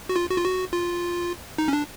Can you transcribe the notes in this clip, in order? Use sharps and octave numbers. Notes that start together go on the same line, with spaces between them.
F#4
F4
F#4
F4
F#4
F4
D#4
C#4
D4